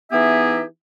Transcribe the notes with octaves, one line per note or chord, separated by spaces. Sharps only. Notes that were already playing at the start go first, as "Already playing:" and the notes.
E3 B3 D#4 G4 G#4 E5